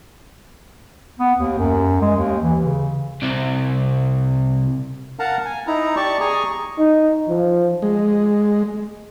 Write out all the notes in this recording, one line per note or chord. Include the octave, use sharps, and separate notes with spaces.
B3
D#2
F#2
G#3
D#2
E3
C#3
C2 C3
A#4 F5 F#5 A5 A#5
G#5
D#4 E4 A#5
G4 D5 A5 C#6
G#4 G#5 A#5 C#6
D#4
F3
G#3